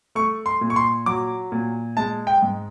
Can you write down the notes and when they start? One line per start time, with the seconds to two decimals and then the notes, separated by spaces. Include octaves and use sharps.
0.15 A3 C#6
0.46 C6
0.61 A#2
0.70 C#6
0.76 C6
1.06 F#3 D6
1.52 A#2
1.97 G#3 A5
2.27 G5
2.42 G#2